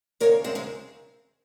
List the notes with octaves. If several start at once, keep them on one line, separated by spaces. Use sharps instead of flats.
D#2 C#3 A#4 C#5
G#3 C4
G#3 C4